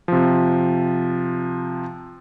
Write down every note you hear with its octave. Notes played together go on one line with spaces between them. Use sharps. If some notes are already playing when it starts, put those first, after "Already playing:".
C3 F3